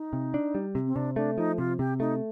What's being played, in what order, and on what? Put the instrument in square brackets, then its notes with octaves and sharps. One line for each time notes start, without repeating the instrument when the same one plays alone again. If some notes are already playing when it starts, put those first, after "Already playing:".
Already playing: [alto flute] D#4
[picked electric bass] C3
D4
G3
C3
[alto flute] C4
[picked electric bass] C3 [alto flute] D4
[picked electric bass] A3 [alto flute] D4
[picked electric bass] F3 [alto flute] D#4
[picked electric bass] C3 [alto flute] F4
[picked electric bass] C3 [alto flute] G4
[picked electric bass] A3 [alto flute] D#4